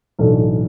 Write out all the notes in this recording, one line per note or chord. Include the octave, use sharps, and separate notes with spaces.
B1 A2 E3 A3 D4